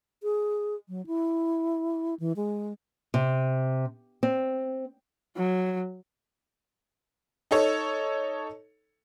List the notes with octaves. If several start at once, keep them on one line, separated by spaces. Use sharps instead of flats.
G#4
F#3
E4
E3
G#3
C3
C4
F#3
D#4 A4 C#5